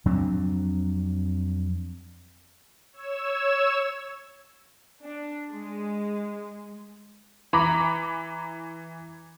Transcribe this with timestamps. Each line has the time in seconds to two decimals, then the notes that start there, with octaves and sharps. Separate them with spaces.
0.05 F2 F#3 C4 D4
2.93 C#5 E6 G#6 E7
5.03 D4
5.51 G#3
7.53 E3 A#5 B5 D6